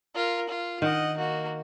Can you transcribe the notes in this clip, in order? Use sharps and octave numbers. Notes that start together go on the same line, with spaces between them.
F4 A#4
F4
D#3 D#5 F#5
A#3 F#4